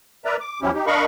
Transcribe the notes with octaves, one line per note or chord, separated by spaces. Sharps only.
A#4 B4 D5 E5 A#5
D6
E2 F3 F#3 C#4 E4 G4
D#4 G4
D4 A#4 D#5 F5 B5 C#6